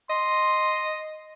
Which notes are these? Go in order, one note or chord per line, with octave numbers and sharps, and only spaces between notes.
D#5 C6